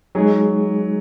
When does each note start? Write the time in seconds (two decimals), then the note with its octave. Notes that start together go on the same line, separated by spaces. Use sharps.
0.15 F#3 G#3 D#4 G#4